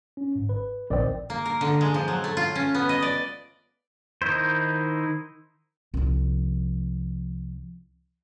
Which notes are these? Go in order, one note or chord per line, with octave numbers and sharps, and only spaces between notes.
C#4
G1 G#2
B4
A#1 D#2 C4 A#4 D5 D#5
A#3
A#4
D3
G#3
F3
F#3
A3
F4
C#4
B3
D#5
D5
D#3 D#4 E4 C5
C2 F3